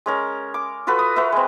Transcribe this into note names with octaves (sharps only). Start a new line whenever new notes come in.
G#3 C#4 A#4
D6
F4 F#4 A4 B4
D#6
F#4 A#4 B4 E5
G#3 C4